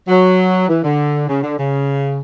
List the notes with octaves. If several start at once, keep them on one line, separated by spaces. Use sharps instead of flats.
F#3
E3
D3
C#3
D3
C#3